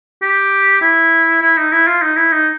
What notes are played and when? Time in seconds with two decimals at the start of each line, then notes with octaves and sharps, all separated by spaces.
0.22 G4
0.81 E4
1.42 E4
1.57 D#4
1.72 E4
1.87 F4
2.02 D#4
2.17 E4
2.32 D#4